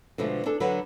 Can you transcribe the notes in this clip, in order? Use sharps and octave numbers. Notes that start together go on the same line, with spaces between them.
B2 D3 F3 G#3 A3
D4 G#4 A4
D3 F#3 B4 F#5